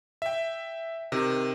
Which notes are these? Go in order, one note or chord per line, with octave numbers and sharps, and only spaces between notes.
E5 G5
C3 D#3